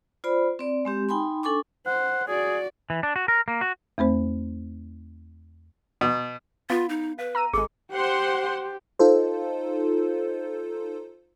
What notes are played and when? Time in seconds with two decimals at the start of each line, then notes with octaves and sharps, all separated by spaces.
0.24 F4 C5 D5 B5
0.59 C4 D5
0.85 G#3 C4 G4
1.09 D#4 G5 G#5 B5 C6
1.43 D4 A4 G#5 C#6 D6
1.87 C5 F#5
2.28 F#4 G#4 D5
2.90 E3
3.03 D4
3.16 F#4
3.28 A#4
3.48 A#3
3.61 F#4
3.98 E2 A3 C4 C5
6.01 B2
6.70 B3 F4 F5 B5
6.89 D#4
7.19 B4 F5
7.35 A#5 E6 D#7
7.53 G#1 G#3 G#4 A4
7.92 G4 C5 F#5 C6
8.99 D#4 F4 A4 C5